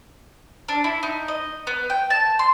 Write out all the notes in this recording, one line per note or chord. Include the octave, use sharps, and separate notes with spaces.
D4
E4
D#4
D#5
B3
G5
A5
C6